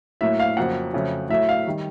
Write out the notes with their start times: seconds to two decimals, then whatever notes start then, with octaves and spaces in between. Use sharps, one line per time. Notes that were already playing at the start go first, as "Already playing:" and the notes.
0.21 A2 F#3 A#3 E5
0.40 F5
0.57 F2 C#3 F#3 A#3 F#5
0.94 F2 C#3 F#3 A3
1.29 A2 F#3 A3 E5
1.49 F5
1.67 D#3 G3